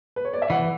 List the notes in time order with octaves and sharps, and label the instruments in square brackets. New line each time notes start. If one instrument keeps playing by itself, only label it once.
[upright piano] B4
C#5
D5
E5
[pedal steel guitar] E3 [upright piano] F#5